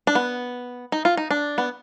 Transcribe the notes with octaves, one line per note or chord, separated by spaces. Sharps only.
D4
B3
D#4
F4
D#4
D4
B3